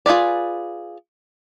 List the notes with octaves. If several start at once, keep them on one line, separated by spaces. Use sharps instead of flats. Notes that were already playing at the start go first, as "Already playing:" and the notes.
F4 G#4 B4 D5